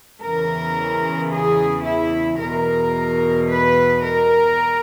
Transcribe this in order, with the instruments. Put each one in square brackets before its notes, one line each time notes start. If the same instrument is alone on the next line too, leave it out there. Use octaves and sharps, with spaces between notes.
[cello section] E2 C#3 E3 A#4
G#4
E4
E2 B2 A#4
B4
A#4